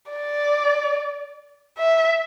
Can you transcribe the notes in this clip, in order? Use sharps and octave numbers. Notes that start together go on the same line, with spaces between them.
D5
E5